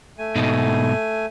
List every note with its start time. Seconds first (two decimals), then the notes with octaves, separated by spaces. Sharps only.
0.18 A3 G#5
0.35 G#2 B2 D#4